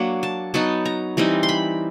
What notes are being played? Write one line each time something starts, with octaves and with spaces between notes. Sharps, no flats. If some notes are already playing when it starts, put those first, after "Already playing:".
Already playing: F#3 A#3 D4
A5
F#3 B3 D#4 A5
A#5
E3 G3 C4 D#4 A#5
C6
B5